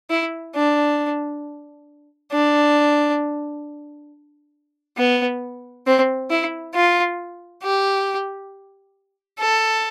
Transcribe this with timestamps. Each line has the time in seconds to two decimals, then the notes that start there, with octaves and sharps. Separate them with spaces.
0.10 E4
0.55 D4
2.32 D4
4.97 B3
5.86 C4
6.30 E4
6.75 F4
7.63 G4
9.39 A4